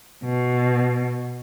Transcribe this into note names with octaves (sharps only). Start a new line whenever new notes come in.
B2